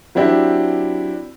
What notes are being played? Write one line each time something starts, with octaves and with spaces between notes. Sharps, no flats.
F#3 C4 D4 E4 G4